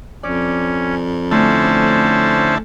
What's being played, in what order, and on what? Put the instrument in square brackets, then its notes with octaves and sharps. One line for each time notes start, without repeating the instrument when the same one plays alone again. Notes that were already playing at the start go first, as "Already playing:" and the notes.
[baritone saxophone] F2 [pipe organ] C#4 [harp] D5
[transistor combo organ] D3 E4 A5 [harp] A3 [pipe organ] C#4 C5